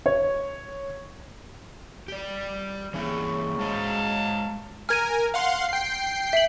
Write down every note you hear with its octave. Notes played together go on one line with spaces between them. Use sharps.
C#5
G4 D5
A2 C#3 E3 A#3 C#4 E4
F#3 G#3 C5 D#5 F5 A5
A#4 G#5 F6 G#6 D#7
F5 F#5 C6
G5 C7
E5 F#7